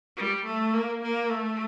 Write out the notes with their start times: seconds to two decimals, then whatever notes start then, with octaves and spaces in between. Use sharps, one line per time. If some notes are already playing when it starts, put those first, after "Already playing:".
0.16 G3
0.44 A3
0.73 A#3
1.02 A#3
1.30 A3